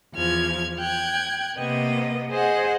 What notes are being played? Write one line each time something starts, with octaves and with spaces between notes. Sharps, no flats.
E2 F3 F6 G#6
G5 F#6 G#6
C3 A#3 B3 D#5
G#4 C5 D#5 F#5